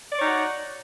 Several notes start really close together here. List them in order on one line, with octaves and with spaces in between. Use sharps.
D5 C#5 D#4 F#4